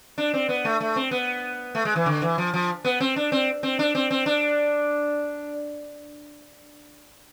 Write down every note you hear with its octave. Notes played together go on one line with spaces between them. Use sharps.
D4
C4
B3
A3
A3
C4
B3
A3
G#3
E3
D3
E3
F3
F3
B3
C4
D4
C4
C4
D4
C4
C4
D4